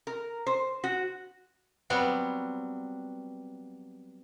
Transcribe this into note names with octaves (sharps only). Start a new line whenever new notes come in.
A#4
C5
F#4
F#3 G3 B3 C4